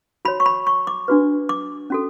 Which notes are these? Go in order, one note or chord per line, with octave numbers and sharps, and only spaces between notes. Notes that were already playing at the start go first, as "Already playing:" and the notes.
F#4 C#5 B5
C#6
B5
C#6
D6
D4 F#4 B4
D6
C#4 F#4 A4